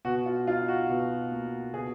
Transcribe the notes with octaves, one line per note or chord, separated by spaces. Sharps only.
B2 F#4
F4
D#4 F4
F#4
B2
A#3
B2 G#4